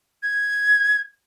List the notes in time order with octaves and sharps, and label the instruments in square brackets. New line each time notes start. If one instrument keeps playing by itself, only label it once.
[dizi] G#6